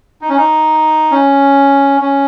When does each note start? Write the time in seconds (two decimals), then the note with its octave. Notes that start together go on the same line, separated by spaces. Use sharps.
0.21 D#4
0.29 C#4
0.37 D#4
1.11 C#4
2.01 C#4